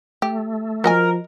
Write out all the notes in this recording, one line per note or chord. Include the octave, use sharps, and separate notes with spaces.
A3 G4
F3 F#4 A#4 D#5 G#5